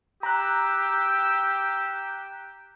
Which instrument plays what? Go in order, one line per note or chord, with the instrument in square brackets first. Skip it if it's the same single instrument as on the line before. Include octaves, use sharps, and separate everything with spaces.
[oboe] G4 [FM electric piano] A#5 F#6 [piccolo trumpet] E6